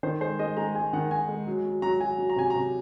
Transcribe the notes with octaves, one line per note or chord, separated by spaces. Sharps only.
D#3 C5
G#3 C5
G#3 D#5
G#3 A#5
G#3 G#5
D#3 F#5
D#3 G#5
G#3
F#3
F#3
F#3 A#5
F#3 G#5
F#3
A#5
C3 G#5
C3 A#5